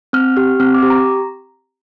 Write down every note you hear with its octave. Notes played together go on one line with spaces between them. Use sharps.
C4 F6
G4 F6
C4 F6
D6
G4
A#5